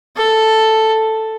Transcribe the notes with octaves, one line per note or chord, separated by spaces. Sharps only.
A4